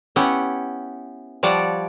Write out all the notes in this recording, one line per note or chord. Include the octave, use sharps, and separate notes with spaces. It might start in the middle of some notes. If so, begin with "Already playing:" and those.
B3 C#4 E4 G4 F#5
F3 G3 C#5 D5 F#5 A5